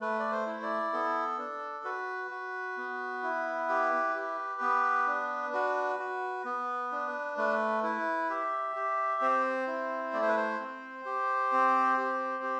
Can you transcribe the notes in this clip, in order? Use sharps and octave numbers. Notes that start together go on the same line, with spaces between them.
A3 B4
D5
C5
E4
D5
B3 A4
D4
F#4 B4
F#4
B3
E4
G4
G4
B3
D4
F#4 B4
F#4
B3
D4
A3 B4
E4 B4
G4 E5
G4
C4 C5
E4
A3 D5
C5
B4
C5
C4
G4
C4
G4
G4